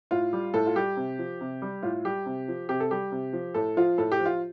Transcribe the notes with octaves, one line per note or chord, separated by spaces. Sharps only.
A2 F4
G3
A2 A4
F4
G3 G4
C3
F3
C3
G3
A2 F4
G3 G4
C3
F3
C3 G4
A4
G3 G4
C3
F3
A2 A4
F3 F4
A2 A4
G4
F3
F4